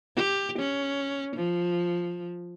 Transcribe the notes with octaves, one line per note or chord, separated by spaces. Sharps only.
G4
C#4
F3